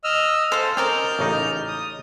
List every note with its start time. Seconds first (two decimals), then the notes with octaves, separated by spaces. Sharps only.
0.04 D#5 E6 F6
0.52 G#4 A4 C5 F5
0.77 C4 C#4 A#4 D5 D#5 F6 G6
1.19 A1 C#3 D#4
1.68 D#6